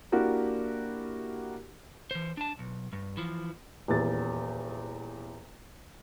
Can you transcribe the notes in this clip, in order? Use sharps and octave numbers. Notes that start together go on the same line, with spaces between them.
A#3 D4 E4 F#4 G4 A#4
E3 C5
D4 A5
B1
G2
E3 F3
D#1 E2 A6